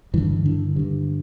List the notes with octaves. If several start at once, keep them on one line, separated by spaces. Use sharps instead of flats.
G2 D3 E3
D3
G2 D3